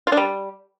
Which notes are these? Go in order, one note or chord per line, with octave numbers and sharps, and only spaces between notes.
F4
D4
G3